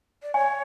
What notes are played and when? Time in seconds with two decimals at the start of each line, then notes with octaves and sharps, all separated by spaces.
0.23 D5
0.34 C#5 G#5